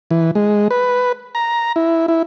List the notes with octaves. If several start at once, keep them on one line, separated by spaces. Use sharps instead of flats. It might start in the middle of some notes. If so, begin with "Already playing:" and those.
E3
G#3
B4
A#5
E4
E4